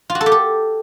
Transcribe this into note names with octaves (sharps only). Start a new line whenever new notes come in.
F4
F#4
A4
G4
A4